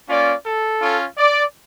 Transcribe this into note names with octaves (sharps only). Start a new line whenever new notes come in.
A#3 C#4 F4 D5
A4
C#4 F4
D5